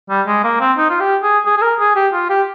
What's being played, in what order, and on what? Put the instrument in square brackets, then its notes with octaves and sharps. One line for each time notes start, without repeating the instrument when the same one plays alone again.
[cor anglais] G3
G#3
A#3
C4
D#4
F4
G4
G#4
G#4
G#4
A#4
G#4
G4
F4
G4